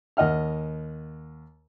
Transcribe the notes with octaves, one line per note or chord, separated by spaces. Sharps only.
D#2 D#5 F#5 F6